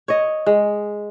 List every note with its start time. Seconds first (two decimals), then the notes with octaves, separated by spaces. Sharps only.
0.08 C#5 D#5
0.47 G#3